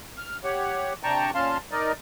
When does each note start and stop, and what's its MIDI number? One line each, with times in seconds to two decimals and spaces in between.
0.18 0.37 89
0.44 0.93 67
0.44 0.93 73
0.44 0.93 78
1.03 1.31 48
1.03 1.31 62
1.03 1.31 79
1.03 1.31 81
1.03 1.31 82
1.03 1.31 85
1.34 1.57 46
1.34 1.57 61
1.34 1.57 77
1.34 1.57 81
1.34 1.57 84
1.71 1.92 63
1.71 1.92 70
1.71 1.92 74
1.71 1.92 75